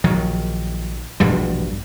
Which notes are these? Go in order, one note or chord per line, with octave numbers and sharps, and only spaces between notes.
A#1 D#3 F#3
E1 A#1 G2 G3